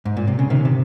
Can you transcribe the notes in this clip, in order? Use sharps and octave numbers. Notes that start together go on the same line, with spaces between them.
G#2
A#2
C3
C#3
C3 D#3
C3